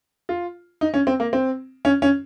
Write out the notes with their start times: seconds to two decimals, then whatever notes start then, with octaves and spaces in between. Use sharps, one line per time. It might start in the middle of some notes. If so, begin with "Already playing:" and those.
0.29 F4
0.81 D#4
0.94 C#4
1.07 C4
1.20 A#3
1.33 C4
1.85 C#4
2.02 C#4